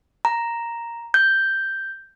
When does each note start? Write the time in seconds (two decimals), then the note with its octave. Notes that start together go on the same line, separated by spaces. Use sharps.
0.25 A#5
1.14 G6